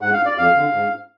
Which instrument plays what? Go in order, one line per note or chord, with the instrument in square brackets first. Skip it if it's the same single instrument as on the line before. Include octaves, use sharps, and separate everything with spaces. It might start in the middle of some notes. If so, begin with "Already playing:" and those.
[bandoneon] G#2 F#5
F5
D5
F2 F5
D3
G#2